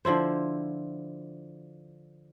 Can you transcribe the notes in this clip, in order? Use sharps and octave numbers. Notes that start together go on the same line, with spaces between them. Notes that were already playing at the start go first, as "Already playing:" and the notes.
D3 F3 E4 C5